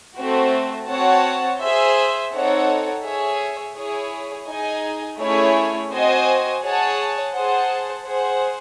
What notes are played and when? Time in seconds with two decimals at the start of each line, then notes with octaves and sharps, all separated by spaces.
0.17 A3 C4 F#4
0.89 C4 F#4 C#5 F#5 A5
1.61 G#4 C5 E5
2.33 C4 D#4 A4 C#5 F#5
3.05 G#4 C#5 E5
3.76 E4 G#4 C#5
4.47 D#4 G#4 D#5 G#5
5.19 A3 C#4 E4 G#4 C#5
5.91 C4 F#4 C5 D#5 G#5
6.63 G#4 C#5 F#5 A5
7.35 G#4 C5 F#5 A5
8.06 G#4 C5 F#5